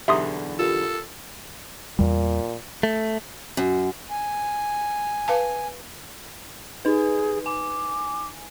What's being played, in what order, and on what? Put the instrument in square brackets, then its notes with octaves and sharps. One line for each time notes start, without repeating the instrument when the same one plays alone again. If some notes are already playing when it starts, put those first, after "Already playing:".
[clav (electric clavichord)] B1 E2 D3 [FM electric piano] G4 A#5 [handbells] E5 C6 D#6
[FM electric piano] F4 G4 A#4 [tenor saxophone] A4
[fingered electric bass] E2 G3 [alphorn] A#2
[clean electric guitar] A3
[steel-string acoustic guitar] F#2
[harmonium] G#5
[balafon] B4 F5 A5
[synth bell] D#4 B4 [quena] G#4
[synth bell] G#5 [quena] D6